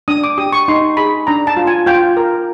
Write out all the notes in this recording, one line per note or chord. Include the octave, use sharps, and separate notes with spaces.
D4 D#6
D6
G4 D#6
C#6
D#4 C6
G#4 B5
D4 A#5
A5
F4
G#5
F4 G5
A#4